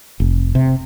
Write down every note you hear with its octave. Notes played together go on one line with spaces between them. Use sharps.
F1
C3